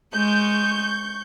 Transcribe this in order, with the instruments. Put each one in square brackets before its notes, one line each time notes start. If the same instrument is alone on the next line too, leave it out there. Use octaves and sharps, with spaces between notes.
[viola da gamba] G#3 [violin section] C#6 G6